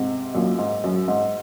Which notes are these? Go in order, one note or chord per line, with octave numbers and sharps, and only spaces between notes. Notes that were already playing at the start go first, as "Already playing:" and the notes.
Already playing: G#2 C3
F#2 A#2
G#2
F#2
G#2